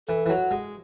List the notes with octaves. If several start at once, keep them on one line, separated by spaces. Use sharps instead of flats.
E3 A4
E3
F#3
G#3